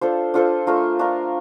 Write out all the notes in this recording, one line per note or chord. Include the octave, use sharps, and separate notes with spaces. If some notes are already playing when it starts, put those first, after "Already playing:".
D4 F4 A4 C5
D4 F4 A4 C5
A3 D4 F4 A#4
A3 D4 F4 A#4